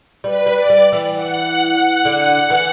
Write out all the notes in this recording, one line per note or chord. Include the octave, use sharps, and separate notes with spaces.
G3 B4
G3
D5
G3
E3
F#5
D3
E3